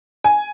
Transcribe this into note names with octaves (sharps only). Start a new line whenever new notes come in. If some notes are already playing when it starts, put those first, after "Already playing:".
G#5